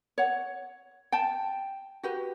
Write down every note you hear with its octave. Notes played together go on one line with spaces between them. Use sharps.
C#5 F#5
G5 A5
F#4 G4 B4